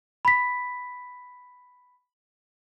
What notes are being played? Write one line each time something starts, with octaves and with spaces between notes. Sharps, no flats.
B5 B6